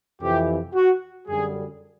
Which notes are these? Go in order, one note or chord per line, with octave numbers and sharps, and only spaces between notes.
F2 C3 E3 G4
F#4
F#2 D3 G3 G#4